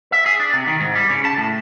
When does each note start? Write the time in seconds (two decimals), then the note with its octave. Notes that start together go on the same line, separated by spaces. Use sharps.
0.12 E5
0.26 G#4
0.40 D4
0.53 C3
0.67 D#3
0.80 G#2
0.95 G3
1.09 C#3
1.25 A5
1.37 A2